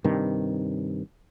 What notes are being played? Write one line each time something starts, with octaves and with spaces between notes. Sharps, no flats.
G2 C3 D#3